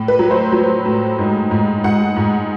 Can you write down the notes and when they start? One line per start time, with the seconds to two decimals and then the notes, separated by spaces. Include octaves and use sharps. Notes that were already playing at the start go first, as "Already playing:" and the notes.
Already playing: A2
0.08 B4
0.19 F#3
0.31 C5
0.52 F#3
0.86 A2
1.19 G#2
1.51 G#2
1.84 G#2 F#5
2.17 G#2